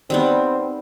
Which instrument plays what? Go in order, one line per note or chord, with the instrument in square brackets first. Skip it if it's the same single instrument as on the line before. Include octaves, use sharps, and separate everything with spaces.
[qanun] D#3 G3 B3 [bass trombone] C4